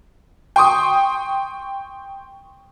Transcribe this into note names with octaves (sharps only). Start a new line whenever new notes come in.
G5 C6 C#6 D#6